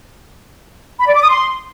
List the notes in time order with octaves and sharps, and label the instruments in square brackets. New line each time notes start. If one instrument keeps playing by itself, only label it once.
[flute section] B5
D5
D6
D#6
C6